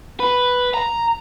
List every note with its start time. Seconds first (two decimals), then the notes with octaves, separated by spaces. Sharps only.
0.20 B4
0.74 A#5